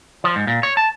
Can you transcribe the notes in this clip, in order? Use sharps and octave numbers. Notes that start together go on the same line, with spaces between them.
F3
G#2
A#2
C#5
A5